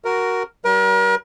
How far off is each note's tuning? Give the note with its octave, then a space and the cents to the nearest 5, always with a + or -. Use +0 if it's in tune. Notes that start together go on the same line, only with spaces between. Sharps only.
F#4 +5 A#4 +0
G3 -40 A#4 +40